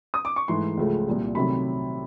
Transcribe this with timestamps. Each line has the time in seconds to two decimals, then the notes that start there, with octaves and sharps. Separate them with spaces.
0.14 D#6
0.25 D6
0.36 C#6
0.48 G#2 E3 A3 C6
0.77 C#2 C#3 F3 A3
1.07 C2 A#2 G3
1.35 C3 D#3 F#3 A3 B5